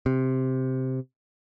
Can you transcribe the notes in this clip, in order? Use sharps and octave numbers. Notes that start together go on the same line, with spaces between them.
C3